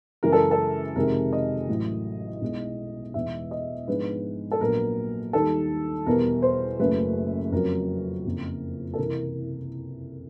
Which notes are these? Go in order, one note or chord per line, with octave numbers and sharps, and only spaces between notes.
F#2 C#3 E3 G#3 A#4
A4
A4
F2 C3 D#3 G#3 A#4
D#5
A1 A2 F#3
B1 B2 G#3
E1 E2 B2 G#3 B3 E5
D#5
G#2 F3 G#3 B3 D4 B4
A4
A#1 A#2 F#3 B3 A#4
D#2 D#3 G3 A4
E2 B2 G3 A#4
C5
F#1 F#2 C#3 F#3 A3 B4
F2 C#3 F#3 A#4
F#1 F2 C#3 F3
A4
C2 C3 E3 A#4